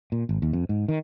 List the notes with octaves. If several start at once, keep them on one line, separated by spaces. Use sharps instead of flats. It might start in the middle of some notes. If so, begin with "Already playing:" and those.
A#2
G#1
D#2
F2
G#2
D#3